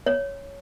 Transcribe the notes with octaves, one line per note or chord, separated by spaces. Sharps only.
C#5